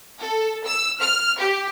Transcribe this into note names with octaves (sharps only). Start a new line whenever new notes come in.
A4
E6
F6
G4